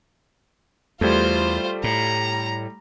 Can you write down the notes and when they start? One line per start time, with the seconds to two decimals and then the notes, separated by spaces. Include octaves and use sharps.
1.01 E2 G3 A3 F4 C5
1.84 A2 A#5